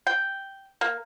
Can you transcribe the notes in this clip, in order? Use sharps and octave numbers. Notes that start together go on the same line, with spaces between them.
G5
A#3